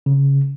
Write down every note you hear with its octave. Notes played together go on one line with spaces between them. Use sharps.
C#3